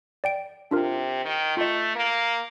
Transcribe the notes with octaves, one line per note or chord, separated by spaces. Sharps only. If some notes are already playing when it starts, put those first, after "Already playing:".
D5 G5 D7
C3 D4 F4 A#4
D#3
A3 F4 D#5
A#3